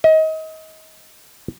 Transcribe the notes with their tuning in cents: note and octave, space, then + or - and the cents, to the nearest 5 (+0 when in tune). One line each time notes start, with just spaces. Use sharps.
D#5 +30